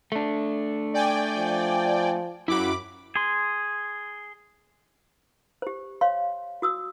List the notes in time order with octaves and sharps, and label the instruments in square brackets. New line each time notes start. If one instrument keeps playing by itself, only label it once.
[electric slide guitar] A3 D4
[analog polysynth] D5 G5 G#5
[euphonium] F3
[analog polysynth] F#2 B5 D6 [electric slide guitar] E4 F#4
[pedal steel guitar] G#4 C6
[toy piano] G4 C5
C5 C#5 F5 C6
F#4 D#6 E6